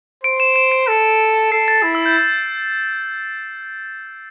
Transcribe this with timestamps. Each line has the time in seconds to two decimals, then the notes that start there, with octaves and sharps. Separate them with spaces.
0.24 C5 D7
0.40 E7
0.56 E7
0.72 D7
0.87 A4
1.52 A4 C7
1.68 A6
1.83 E4
1.95 E6
2.06 G6